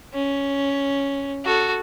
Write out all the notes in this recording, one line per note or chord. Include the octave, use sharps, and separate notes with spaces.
C#4
F#4 A4